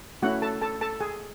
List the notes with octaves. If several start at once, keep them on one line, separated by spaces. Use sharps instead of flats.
A3 C#4 E4 F#4 F#5
A4 A5
A4 A5
A4 A5
G#4 G#5